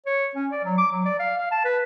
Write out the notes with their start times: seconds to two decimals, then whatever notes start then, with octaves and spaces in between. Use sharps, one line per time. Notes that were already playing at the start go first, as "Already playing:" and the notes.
0.06 C#5
0.35 C#4
0.51 D5
0.64 F#3
0.78 D6
0.91 F#3
1.06 D5
1.19 F5
1.38 F5
1.51 A5
1.65 B4